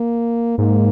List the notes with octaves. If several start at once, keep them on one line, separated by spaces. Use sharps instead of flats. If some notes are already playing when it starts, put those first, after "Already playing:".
Already playing: A#3
G#2 A#3